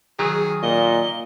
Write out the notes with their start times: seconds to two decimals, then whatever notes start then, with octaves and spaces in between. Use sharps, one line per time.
0.19 D#3 F#3 G#4
0.63 A#2 D#5 G7